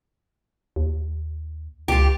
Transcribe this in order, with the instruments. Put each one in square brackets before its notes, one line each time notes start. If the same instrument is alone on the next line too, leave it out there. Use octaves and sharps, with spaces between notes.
[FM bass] D#2
[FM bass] C#2 [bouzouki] F4 G4